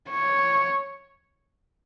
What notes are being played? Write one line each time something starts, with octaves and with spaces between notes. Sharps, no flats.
C#5